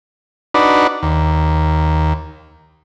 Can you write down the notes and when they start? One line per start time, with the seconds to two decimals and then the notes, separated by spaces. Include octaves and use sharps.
0.54 D4 D#4 F#4 B4 D5
1.03 D#2